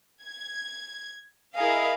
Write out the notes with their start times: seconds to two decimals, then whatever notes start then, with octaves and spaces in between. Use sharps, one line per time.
0.24 G#6
1.55 E4 G#4 A#4 D#5 F5